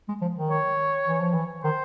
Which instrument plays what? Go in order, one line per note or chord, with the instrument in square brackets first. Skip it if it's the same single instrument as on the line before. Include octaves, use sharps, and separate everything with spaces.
[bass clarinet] G#3
F3
D#3
[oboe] C#5
[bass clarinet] E3
F3
E3
[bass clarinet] D#3 [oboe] C5